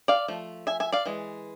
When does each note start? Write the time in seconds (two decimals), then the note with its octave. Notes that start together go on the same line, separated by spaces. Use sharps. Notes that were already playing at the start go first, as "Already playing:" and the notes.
0.08 D5 F5
0.28 F3 A3
0.67 E5 G#5
0.80 E5 G#5
0.92 D5 F5
1.06 E3 G#3